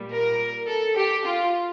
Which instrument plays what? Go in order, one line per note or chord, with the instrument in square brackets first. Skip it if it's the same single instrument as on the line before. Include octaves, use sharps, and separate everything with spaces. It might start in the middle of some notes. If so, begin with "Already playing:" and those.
Already playing: [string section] A#2 G3
A#4
A4
G4
F4